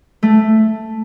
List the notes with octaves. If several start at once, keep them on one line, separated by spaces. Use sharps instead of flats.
A3